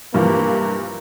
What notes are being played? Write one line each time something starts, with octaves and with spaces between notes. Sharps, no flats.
G2 E3 F3 A#3